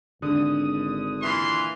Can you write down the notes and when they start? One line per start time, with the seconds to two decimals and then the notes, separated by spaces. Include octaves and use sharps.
0.22 G#1 D3 D#6
1.22 A#2 E3 C6